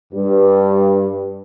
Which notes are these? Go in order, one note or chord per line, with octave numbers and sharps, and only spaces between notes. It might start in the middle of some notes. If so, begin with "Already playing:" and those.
G2